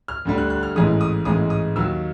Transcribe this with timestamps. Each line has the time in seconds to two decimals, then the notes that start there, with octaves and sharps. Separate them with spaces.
0.08 F6
0.25 D2 D3 G3
0.38 F#6
0.50 F#6
0.63 F6
0.75 A1 G#2 E3 G#3 D#6
1.01 D#6
1.25 A1 G#2 E3 G#3 D#6
1.50 D#6
1.76 D#2 D#3 F#3 E6